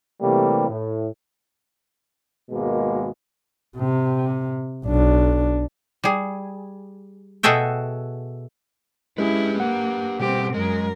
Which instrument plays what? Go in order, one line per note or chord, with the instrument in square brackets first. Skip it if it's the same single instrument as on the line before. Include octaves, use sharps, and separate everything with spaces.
[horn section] C3 E3 G3 A3 A#3
A2
[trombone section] G#1 B2 G#3 A#3
[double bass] C3
B1 D4
[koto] G3 G#4
B2 F#4 G#4 A4 E5 G5
[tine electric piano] G#3 C#4 G#4 [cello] E4 [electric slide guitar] G4 B4
[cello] A#3 [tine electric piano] F#5
[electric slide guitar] B2 G3 [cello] C4 G4
[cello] F#2 A#4 [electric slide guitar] G#3